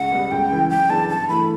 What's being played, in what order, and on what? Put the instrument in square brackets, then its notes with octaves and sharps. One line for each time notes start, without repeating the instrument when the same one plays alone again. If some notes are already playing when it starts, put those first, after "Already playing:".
Already playing: [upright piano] C#2 [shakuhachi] F#5
[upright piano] B2 G3
[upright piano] C#2 [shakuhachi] G5
[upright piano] C#3 E3
[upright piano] F#2 [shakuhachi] G5
[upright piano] C#3 E3 B3 D4 [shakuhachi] A5
[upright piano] G2 [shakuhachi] A5
[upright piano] E3 A3 E4 [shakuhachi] B5